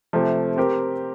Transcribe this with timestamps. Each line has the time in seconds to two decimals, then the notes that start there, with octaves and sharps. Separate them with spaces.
0.13 C3 F3 A3
0.57 C4 G4 A#4